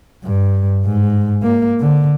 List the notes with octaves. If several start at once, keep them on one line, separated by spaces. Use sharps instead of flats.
G2
G#2
A#3
D3